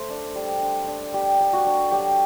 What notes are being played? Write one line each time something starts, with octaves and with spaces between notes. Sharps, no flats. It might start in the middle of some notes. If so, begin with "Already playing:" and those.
Already playing: A3 C5
D4
G3
D4
D4
G3 G4
G3
F#4
D4
F#3 G4